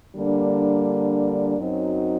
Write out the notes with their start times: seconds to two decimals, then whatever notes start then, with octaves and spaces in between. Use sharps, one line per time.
0.15 D3 G3 A#3 D4
1.57 F#2 F#3 C4 D#4